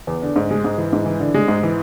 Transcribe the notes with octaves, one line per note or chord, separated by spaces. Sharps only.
E2
D3
G#2
G#3
G#2
E3
G#2
E3
D3
G#3
G#2
E3